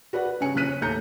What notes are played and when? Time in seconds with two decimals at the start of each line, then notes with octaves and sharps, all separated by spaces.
0.13 F#4 B4 D5 F#5
0.25 B4
0.41 G2 C#3 C#4 G#5 C#7
0.55 F#1 A#2 C#3 F#6 B6 D#7
0.69 C#5
0.81 D#2 A2 A3 A#5 G6 C#7